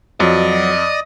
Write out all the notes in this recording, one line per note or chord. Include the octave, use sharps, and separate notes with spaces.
F2 F#3 D5 D#5